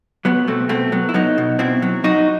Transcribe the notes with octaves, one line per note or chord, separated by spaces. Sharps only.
F#3 B3
B2 A3 C4
B2 A3 C4
F#3 B3
E4
F#3 B3 D#4
B2
B2 C4 E4
F#3
F#3 D#4 F#4